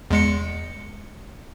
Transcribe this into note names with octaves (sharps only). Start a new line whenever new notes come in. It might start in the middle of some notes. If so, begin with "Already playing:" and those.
E2 G#3 C#7